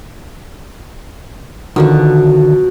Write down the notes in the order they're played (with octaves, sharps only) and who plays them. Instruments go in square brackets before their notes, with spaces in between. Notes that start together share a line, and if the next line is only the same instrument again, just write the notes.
[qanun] B2 F3 F#3 [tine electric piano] D3 D#3